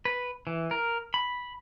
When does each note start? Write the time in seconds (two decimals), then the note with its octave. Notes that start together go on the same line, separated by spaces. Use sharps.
0.05 B4
0.47 E3
0.71 A#4
1.14 B5